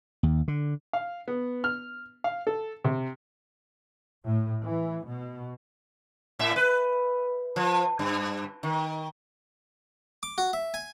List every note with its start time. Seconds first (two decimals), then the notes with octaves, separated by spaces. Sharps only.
0.23 D#2
0.48 D3
0.93 F5
1.28 B3
1.64 F6
2.24 F5
2.47 A4
2.84 C3
4.26 A2
4.64 E3
5.05 B2
6.39 A2 E5
6.56 B4
7.56 F3
7.99 G2
8.63 D#3
10.23 D6
10.38 F#4
10.53 E5
10.74 G#5